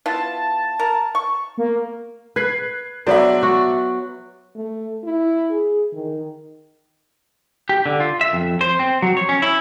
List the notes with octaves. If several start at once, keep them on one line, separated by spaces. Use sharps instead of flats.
B3 E4 F4 A5
A#4
C#6
A#3
B4 F#6 G#6 C7
F#3 B3 D4 C5 D5 E5
F#4
A3
E4
G#4
D#3
G4
D3
F4
E5
F2
C5
C4
F#3
C#5
C#4
E4